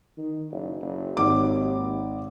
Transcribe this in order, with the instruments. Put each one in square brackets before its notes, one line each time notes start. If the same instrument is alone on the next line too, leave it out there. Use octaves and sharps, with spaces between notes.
[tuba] D#3
F#1
F#1
[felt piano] G#1 D6 [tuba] D#2